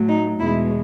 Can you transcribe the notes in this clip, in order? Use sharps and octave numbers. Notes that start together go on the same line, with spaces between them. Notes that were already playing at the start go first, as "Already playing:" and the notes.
Already playing: A2 F#3 A3
D#4
E2 B2 G#3 E4